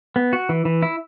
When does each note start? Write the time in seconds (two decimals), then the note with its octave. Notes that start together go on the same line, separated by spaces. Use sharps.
0.16 B3
0.33 F#4
0.49 E3
0.65 E3
0.82 E4